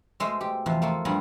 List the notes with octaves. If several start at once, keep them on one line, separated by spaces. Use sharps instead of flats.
B2 G#3 A3 A4 C5
G4
E2 C3 F3
A3 A#3 F4 A4
G2 F3 G3 F#5 G#5 A#5